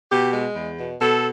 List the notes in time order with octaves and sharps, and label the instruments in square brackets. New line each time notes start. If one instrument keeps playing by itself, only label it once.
[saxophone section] B2 G4
G#3
E2
B2
B2 A4